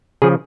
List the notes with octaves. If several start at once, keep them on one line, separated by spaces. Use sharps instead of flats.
C#3 F3 G#4